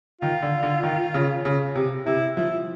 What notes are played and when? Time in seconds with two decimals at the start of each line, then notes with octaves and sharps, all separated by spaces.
0.21 D#3 F4
0.42 D3
0.63 D3
0.83 D#3
1.14 C#3
1.45 C#3
1.75 C3
2.06 C3 E4
2.37 F3 E4